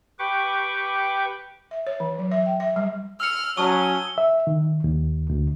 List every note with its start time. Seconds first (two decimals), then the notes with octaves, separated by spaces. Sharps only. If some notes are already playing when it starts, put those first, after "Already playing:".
0.19 G4 B4 G5 C#6 D6
1.71 E5
1.87 C#5
2.00 E3
2.19 F#3
2.31 E5
2.46 G5
2.60 E5
2.76 G3
3.20 E6 F6 C#7
3.57 F#3 C#4 C#5 A5 C#6 D#6 G7
4.18 E5
4.47 D#3
4.84 D#2
5.30 D2